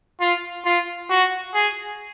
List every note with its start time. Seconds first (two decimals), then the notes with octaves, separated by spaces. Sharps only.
0.20 F4
0.66 F4
1.10 F#4
1.54 G#4